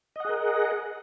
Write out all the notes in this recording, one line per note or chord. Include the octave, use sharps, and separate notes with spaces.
G#4 A#4 D#5 F#5